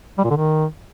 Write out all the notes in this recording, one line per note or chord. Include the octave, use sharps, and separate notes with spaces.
G3
A#2
D3
D#3